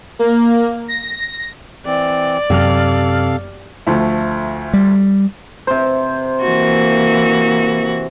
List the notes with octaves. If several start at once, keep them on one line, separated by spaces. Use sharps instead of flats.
A#3
A#6
E3 C4 D5
F#2 C3 A4 F5 F6
D2 F3 A3
G3
C3 C5
E3 A#3 F#4